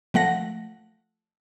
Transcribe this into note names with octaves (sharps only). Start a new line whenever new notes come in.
F3 A3 F#5 A#6